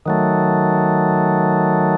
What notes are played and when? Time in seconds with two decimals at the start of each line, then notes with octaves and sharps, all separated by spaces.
0.06 D#3 F#3 A3